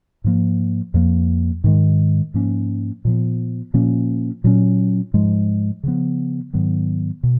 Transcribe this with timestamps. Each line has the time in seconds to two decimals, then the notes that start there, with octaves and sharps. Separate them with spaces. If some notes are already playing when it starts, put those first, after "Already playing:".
0.24 G#2 F3 A#3
0.94 F2 F3 A#3
1.64 G#2 D#3 G#3
2.34 G#2 F3 A#3 C#4
3.05 A#2 F3 B3
3.74 A#2 F3 A#3 C#4
4.44 A#2 F#3 C#4
5.14 G#2 F3 G#3
5.83 C#3 F3 B3
6.53 G#2 D#3 F#3 B3
7.23 B2